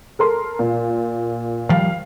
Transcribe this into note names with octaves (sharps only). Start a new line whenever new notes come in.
A4 A#4 C6
A#2
D#3 F3 G3 F5